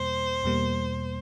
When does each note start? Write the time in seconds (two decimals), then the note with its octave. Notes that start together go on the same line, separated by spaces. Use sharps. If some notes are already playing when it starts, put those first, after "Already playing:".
Already playing: E2 B2 G3 A#3 C5
0.44 E2 B2 G3 A#3